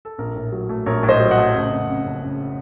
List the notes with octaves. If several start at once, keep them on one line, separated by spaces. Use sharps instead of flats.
A4
A#1 A#4
A2
F#3
A3
A#1 A#4 C#5
A2
C5 D#5
F#3
D#5 F#5
A3
F#1
F2
C#3
F#1
F#1